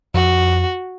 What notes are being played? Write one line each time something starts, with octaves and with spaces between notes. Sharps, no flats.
F2 F#4